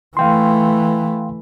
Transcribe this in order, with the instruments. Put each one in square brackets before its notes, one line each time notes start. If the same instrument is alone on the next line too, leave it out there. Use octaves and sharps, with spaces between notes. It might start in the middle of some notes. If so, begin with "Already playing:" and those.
[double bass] E3 A3 [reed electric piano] F5 G5 C6